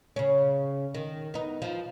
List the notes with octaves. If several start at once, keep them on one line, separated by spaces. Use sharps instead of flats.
C#3 C#4
D#3
B3 D#4
F3